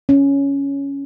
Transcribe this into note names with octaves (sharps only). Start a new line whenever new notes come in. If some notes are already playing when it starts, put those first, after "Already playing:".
C#4